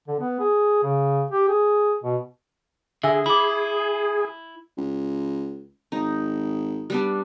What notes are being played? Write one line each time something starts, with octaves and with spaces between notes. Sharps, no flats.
D3
B3
G#4
C#3
G4
G#4
B2
D3 G#4 E5 G#5 E6
E4 B5 D6
C#2
G#1 D#4
G3 B3 D4